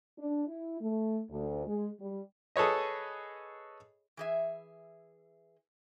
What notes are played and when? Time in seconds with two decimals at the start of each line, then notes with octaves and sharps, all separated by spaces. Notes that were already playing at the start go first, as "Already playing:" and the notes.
0.19 D4
0.47 E4
0.81 A3
1.30 D2
1.66 G#3
2.00 G3
2.56 G#4 A4 B4 C#5 D#5
4.17 E3 G#4 E5